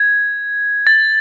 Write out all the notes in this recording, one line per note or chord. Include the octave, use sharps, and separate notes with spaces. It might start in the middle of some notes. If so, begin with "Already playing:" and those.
Already playing: G#6
A6